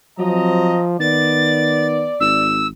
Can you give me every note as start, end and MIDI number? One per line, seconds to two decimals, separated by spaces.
0.19 0.96 53
0.19 0.75 54
0.19 0.86 60
0.19 0.86 75
0.19 0.86 82
1.00 2.06 51
1.00 2.19 59
1.00 2.53 74
1.00 1.86 93
2.20 2.72 32
2.20 2.66 88